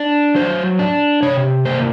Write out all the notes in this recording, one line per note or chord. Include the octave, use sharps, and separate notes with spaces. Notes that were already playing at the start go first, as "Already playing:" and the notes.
Already playing: D4
F#3 C5
D4
C3 C#5
A#3 C5